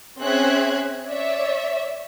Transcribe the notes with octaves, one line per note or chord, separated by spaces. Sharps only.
C4 C#4 G#4 E5 F#6 G#6
C#5 D5 E5